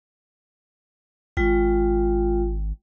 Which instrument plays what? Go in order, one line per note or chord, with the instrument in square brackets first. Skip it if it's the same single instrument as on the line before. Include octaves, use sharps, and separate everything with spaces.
[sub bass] G#1 [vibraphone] G#3 F4 G5